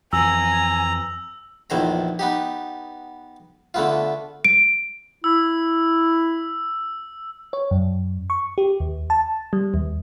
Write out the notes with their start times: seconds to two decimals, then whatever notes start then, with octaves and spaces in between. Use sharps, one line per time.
0.13 F2 E3 G#5 A#5 E6 F#7
1.70 A#1 E2 D#3 C5 A#5
2.19 B3 D#4 G4
3.74 D3 A3 B3 F4
4.45 D7
5.24 E4 E6
7.53 C#5
7.71 F#2
8.30 C#6
8.58 G4
8.80 D#2
9.10 A5
9.53 G3
9.74 D#2